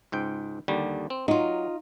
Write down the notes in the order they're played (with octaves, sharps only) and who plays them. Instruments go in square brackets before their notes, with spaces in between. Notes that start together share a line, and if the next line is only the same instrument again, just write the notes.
[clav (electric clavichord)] C#2 G#2 G5
D#2 D3 G3
C4
[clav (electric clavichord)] F#3 [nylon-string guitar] D#4 F4